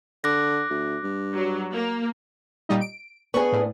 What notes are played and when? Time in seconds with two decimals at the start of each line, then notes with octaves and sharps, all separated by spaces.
0.24 D3 D6 F#6 A#6
0.70 D2
1.03 G2
1.34 F#3
1.73 A#3
2.69 A#2 G3 D#4
2.81 D7
3.34 B3 D4 G#4 C#6
3.52 A2